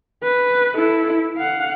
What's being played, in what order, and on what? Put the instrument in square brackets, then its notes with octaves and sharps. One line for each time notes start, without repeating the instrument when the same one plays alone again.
[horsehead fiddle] B4
E4 A4
F5 F#5